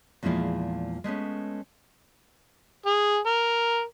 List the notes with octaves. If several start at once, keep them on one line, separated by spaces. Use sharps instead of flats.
E2 A#2 F3 G#3 E4 F5
G#3 A3 B3 C#4
G#4
A#4